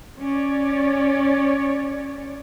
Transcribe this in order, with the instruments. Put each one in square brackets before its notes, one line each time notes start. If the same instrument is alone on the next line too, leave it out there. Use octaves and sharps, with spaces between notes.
[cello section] C#4 C#5 D5